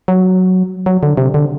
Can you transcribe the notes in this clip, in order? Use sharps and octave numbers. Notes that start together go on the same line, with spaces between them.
F#3
F#3
D3
C3
D3